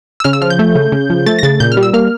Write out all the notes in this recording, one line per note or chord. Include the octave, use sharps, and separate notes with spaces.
E6
C#3 F6
E6
F3 F6
G6
A3
C#3
C#3
F3
A3 A6
A#6
C#3 A6
A#2 G6
F6
G3
E6
A#3 F6